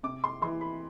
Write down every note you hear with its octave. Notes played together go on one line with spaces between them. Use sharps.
C3 D6
C6
E3 C6
B5